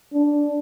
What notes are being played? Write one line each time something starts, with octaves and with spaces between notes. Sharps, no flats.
D4